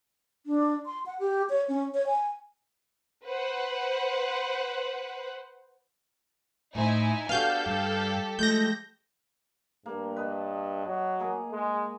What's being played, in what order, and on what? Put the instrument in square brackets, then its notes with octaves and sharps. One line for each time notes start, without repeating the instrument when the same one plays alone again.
[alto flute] D4
C6
F#5
G4
C#5
C#4
C#5
G#5
[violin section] B4 C5 F#5
[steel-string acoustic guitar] A2 C5 [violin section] D#4 E4 G#5
[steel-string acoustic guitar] B3 D4 F#4 [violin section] G4 A4 [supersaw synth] F5 G6
[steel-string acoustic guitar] G2
[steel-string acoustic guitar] F3 G#3 A3 [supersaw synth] G6 A#6
[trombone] G2 [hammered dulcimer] A#3
[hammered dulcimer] B4 D#5 A5
[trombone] F#3
[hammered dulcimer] A#3 G#4
[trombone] G#3